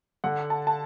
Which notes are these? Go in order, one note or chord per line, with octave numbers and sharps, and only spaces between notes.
D3 F#5
A5
A5